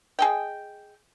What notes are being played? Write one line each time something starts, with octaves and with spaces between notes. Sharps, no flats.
G#4 D#5 G5